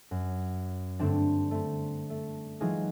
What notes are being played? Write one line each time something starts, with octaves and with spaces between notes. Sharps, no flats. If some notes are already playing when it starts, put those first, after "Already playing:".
F#2
G2 D3 A3 C4 D4
A3 C4
A3
E3 F#3 G#3 D#4 F4 G#4